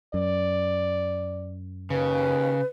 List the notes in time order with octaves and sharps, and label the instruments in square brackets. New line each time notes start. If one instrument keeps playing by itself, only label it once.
[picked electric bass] F#2 [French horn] D5
[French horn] D#2 [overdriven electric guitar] C#3 [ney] B4